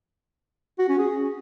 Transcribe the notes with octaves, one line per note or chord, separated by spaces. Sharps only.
F#4
C#4
G#4